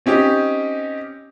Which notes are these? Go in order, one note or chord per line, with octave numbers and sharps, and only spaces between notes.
C4 C#4 D#4 G4